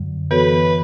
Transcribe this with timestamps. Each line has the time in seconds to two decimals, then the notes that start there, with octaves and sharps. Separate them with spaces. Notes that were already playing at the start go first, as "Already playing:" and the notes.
Already playing: F#2 D3 F#3
0.31 E3 B3 F#4 A4 B4 C#5